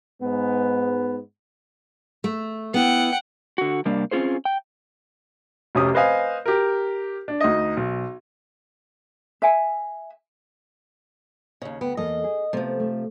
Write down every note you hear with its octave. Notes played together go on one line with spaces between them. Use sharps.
G#2 B3
A3
B3 E4 F#5 G5
D3 F#4
C3 G3 A#3 D4
C4 C#4 F4 G#4 C5
G5
F1 C3 C#4 G4 D#6
B4 C5 D#5 F5 G#5
G4 A#4
D4
D2 D#4 D#5
B1
E5 G#5
D#2 C#3
D2 B3 G5
E2 A#3 A4 D#5
G#4
C3 F3 A3 B3
A3